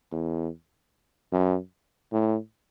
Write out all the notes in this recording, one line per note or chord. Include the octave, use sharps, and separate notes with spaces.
E2
F#2
A2